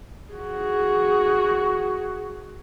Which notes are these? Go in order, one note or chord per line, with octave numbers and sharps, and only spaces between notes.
F#4 G#4